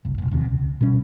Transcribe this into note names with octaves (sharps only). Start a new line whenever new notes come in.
F#1 C2
F1 B1
E1 D#2 C3
C#2
B2 G3 C#4